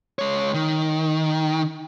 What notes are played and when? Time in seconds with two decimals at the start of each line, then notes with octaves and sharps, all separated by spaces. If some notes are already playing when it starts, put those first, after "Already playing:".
0.19 G#3 C#5
0.54 D#3